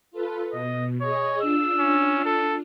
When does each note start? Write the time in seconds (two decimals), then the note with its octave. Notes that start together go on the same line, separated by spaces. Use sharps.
0.11 F4 A4 B4
0.53 B2 D#5
1.01 G#4 C#5 D#5
1.41 D4 F4 E6
1.79 C#4
2.25 A4